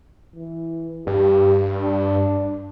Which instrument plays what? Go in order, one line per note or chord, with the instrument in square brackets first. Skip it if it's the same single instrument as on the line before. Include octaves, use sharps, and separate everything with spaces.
[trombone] E3
[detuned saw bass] G2 [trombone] G4
[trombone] D4